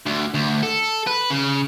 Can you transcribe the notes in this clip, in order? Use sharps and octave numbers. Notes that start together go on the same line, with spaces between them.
D2
D2
A4
B4
C#3